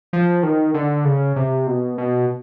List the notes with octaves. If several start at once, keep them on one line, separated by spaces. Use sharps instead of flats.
F3
D#3
D3
C#3
C3
B2
B2